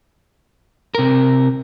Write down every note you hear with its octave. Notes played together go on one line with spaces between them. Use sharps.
C3 A#4